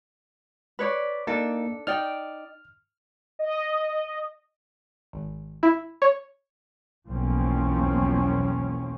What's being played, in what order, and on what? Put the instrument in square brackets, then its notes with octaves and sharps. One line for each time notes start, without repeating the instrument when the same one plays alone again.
[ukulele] B4 C#5 D5
[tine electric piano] A#3 D#4 [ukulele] D4 A4
[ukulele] D#4 D5 G5 [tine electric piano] F6
[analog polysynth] D#5
[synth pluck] G#1
E4
C#5
[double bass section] B1 E2 F3 A#3 C4 C#4